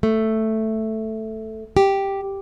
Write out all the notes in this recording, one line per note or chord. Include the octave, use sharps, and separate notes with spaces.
A3
G4